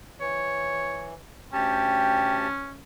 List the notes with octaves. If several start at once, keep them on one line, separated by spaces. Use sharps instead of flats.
E3 C#5
D2 C#4 G4 G5 A5